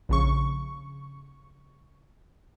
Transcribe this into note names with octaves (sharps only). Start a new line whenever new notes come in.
A#1 C#3 C#6